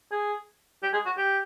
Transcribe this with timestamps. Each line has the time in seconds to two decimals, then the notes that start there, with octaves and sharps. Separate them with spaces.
0.12 G#4
0.83 G4
0.93 G#4
1.06 F#4
1.17 G4